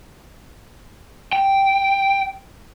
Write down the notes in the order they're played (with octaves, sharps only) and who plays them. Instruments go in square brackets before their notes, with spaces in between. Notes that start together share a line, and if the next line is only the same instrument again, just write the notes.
[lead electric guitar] G5